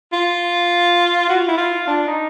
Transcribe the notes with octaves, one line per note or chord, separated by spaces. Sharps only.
F4
F#4
F4
E4
F4
D4
D#4